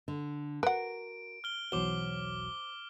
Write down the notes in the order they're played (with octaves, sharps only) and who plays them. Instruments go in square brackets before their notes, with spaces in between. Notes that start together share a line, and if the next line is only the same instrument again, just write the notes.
[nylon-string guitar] D3
[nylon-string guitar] F#4 A#4 [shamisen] B4 F#5 [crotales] D7
[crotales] F6 G7
[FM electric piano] B1 E2 F#3 [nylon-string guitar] C5 [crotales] D6 G7